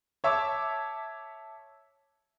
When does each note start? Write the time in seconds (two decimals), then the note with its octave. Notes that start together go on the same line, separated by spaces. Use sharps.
0.24 C#5 E5 A5 D6